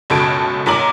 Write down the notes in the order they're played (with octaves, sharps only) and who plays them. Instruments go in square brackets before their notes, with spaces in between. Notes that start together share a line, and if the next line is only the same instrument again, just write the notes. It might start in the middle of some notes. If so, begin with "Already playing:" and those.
[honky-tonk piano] F#1 C#2 B2 A4 G#6 D7
B1 A#2 A#5 D6 F#7